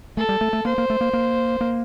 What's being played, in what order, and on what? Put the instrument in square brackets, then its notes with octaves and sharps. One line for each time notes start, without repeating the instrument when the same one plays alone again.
[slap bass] A3 [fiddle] A4
[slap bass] G3
A3
A3
[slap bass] A#3 [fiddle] C5
[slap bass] A#3
A3
A#3
A#3
A#3